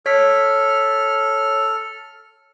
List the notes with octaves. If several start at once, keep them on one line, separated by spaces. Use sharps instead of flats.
A4 C#5 F6 B6